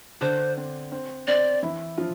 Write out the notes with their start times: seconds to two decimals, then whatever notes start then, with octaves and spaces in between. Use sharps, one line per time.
0.21 D3 D4 C5
0.57 C4
0.92 C4
1.27 C4 D5
1.63 E3 E4
1.97 F3 F4